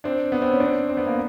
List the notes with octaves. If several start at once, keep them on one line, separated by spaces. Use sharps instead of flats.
C4 D4
B3
C4
C#4
C4 D4
C4
B3
A#3